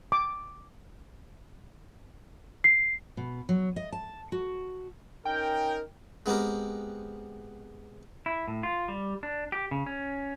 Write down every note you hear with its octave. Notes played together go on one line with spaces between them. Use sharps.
D6
C7
B2
F#3
D#5
A5
F#4
C#4 D#4 A#4 G5
G#3 B3 C4 G4 A#4
E4
A2
F4
G3
D4
G4
C#3
C#4